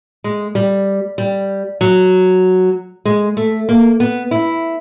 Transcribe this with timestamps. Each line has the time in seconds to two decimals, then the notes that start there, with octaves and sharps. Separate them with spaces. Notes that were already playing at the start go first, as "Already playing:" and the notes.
0.24 G#3
0.55 G3
1.18 G3
1.81 F#3
3.05 G#3
3.37 A3
3.69 A#3
4.00 B3
4.31 E4